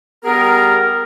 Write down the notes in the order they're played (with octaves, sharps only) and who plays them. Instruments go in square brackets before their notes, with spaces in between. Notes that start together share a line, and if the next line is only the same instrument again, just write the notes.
[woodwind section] G3 B3 G#4 A#4